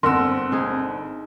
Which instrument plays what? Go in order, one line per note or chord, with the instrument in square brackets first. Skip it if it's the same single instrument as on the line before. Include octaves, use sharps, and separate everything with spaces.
[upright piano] G1 F#5 E6 [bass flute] C4 [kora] A#4 [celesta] C6
[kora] D#4 G#4